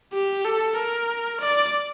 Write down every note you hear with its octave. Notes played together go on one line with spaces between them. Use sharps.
G4
A4
A#4
D5